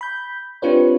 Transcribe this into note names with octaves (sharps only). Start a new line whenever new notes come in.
B5 G6
C4 D4 F4 G4 B4 C#5